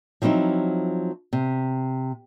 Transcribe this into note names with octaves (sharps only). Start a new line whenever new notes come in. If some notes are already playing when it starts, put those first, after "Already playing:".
F3 F#3 C4 D#4 E4
C3